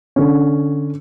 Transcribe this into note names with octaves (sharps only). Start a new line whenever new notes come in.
D3 C#4